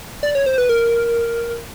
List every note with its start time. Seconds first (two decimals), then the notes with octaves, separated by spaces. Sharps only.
0.23 D5
0.35 C#5
0.46 C5
0.58 B4
0.69 A#4